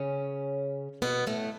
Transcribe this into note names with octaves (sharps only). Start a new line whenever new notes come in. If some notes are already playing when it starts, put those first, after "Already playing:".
Already playing: C#3 C#4
B2 B3
A2 A3